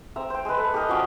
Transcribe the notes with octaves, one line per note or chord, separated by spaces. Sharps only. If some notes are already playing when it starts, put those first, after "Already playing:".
C4 E5 A#5
C5 G5
G#3 B4
A4 B4
G4 G#4 A#4 D#5
F3 F#3 C#4 D5